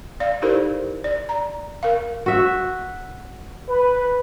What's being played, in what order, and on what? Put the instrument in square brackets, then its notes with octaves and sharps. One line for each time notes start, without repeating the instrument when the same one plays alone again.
[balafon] D5 F5
D#4 E4 G4 A4 A#4 C5
D5
A#5
A#4 F5
[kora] F#4 E5
[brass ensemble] B4